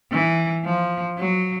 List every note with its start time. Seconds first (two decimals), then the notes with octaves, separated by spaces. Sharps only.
0.12 E3
0.65 F3
1.18 F#3